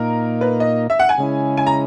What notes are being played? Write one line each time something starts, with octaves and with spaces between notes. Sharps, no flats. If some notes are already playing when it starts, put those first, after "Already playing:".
Already playing: A#2 A#3 D#4 A#4
B4
D#5
E5
F#5
G#5
C#3 G#3 C#4 E4
G#5
A#5